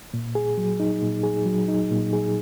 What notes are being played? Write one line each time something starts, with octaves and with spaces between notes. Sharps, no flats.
A#2
G#4
F#3
D#4
A#2
G#4
F#3
D#4
A#2
G#4